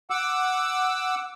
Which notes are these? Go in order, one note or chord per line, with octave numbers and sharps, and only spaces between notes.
F#5 D6 E6